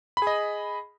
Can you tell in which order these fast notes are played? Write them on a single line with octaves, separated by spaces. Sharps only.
B5 G#4 D#5